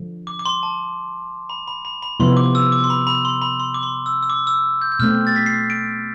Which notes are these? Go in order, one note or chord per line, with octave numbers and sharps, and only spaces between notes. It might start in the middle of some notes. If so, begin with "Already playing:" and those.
Already playing: D3 F3
D6
D6
C6
A5
B5
B5
B5
B5
C3 F3 B3 E4 C6
D6
E6
D6
C6
B5
B5
C6
B5
C6
D6
C6
E6
E6
D6
E6
G6
G6
B2 A3 C4 F6
A6
B6
C7
D7